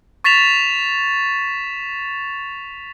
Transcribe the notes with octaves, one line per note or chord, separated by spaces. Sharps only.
C#6 A6 B6 E7 F7